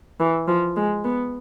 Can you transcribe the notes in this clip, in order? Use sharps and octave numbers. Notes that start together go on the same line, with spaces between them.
E3
F3
G#3
B3